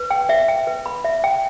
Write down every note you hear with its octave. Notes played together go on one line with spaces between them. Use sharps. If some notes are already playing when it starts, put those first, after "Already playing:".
Already playing: B4
G5
E5
G5
B4
B5
E5
G5